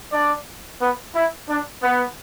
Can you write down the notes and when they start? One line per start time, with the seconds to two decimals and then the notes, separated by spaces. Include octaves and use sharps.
0.13 D4 D5
0.81 B3 B4
1.16 E4
1.49 D4
1.83 B3